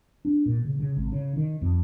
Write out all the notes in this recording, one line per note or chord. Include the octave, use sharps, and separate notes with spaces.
D4
A#2
C#3
C#3
G#1
C#3
D#3
F2